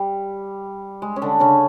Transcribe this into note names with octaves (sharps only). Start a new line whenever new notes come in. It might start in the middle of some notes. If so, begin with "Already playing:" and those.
Already playing: G3
G#3
C#4
D3 D4
C#3 C#4